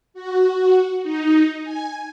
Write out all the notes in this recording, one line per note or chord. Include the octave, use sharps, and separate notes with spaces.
F#4
D#4
G#5